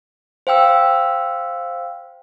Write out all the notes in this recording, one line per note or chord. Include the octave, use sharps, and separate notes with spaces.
C5 F5 G5 E6